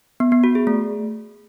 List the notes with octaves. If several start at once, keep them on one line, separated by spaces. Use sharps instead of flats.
B3
B3
F#4
G#4
A3